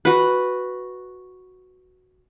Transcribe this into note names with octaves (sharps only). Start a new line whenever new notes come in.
F#4 B4